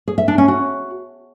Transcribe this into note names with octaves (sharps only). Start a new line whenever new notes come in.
G#4
E5
D4
C#4
F#4